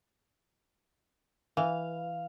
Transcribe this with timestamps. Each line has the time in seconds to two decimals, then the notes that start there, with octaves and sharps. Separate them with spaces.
1.57 E3 F5